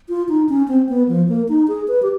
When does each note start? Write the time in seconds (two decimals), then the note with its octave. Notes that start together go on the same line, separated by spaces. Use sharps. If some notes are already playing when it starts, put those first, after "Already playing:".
0.09 F4
0.29 D#4
0.49 C#4
0.68 C4
0.89 B3
1.08 F3
1.29 A#3
1.49 D#4
1.68 G#4
1.88 B4
2.02 G4